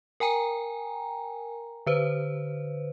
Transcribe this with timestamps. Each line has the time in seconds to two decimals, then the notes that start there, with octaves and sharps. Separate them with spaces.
0.20 A#4 G5 G#5 A#5
1.87 D3 B4 C5